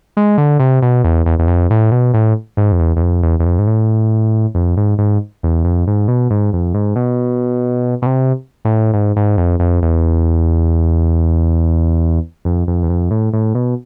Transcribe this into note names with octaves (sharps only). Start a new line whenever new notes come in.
G#3
D3
C3
B2
E2
E2
E2
F2
A2
B2
A2
G#2
F2
E2
E2
F2
E2
E2
F2
G#2
A2
F2
G#2
G#2
E2
F2
G#2
B2
G#2
F2
G#2
B2
B2
C3
A2
G#2
G#2
F2
F2
E2
F2
F2
E2
F2
A2
A2
B2